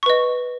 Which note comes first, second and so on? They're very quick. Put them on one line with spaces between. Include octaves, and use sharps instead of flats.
C#6 B4 D#5